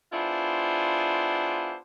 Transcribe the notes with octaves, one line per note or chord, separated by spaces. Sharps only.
B3 D4 E4 F4 G#4 C5